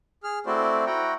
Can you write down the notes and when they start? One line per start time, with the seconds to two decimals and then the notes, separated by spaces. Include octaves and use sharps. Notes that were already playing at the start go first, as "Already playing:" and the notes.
0.24 G#4 F6
0.46 A3 C4 E4 F#4 C5 D5
0.86 E4 F#4 F#5 G5 A#5